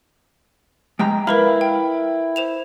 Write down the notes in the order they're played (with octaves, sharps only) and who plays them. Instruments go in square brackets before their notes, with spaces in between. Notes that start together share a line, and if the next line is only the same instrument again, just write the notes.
[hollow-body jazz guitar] G#3 G5 A#5
[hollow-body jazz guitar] E4 F5 [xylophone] A#4 B4 B5
[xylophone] G5
C5 E7 F7